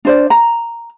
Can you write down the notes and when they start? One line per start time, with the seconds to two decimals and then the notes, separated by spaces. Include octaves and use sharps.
0.05 D4 C5 D5
0.30 A#5